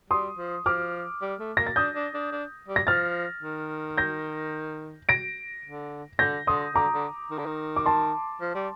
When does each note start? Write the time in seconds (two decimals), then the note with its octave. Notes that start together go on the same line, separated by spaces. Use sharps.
0.10 G3 C6 D#6
0.38 F3
0.66 F3 D6 F6
1.22 G3
1.40 A3
1.57 A#3 A#6
1.66 A6
1.76 D4 D#6 G6
1.95 D4
2.14 D4
2.32 D4
2.68 G3
2.76 A#6
2.87 F3 F6 A6
3.43 D#3
3.97 G6 A#6
5.09 A#6 D7
5.65 D3
6.19 D3 G6 A#6
6.47 D3 C6 D#6
6.74 D3 A#5 D6
6.94 D3
7.31 D#3
7.39 D3
7.46 D#3
7.76 D6
7.86 A5 C6
8.41 F3
8.55 G3